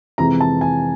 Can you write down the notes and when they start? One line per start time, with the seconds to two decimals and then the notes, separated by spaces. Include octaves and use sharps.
0.18 F2 C3 E3 G#3 A#5
0.41 A5
0.61 G#5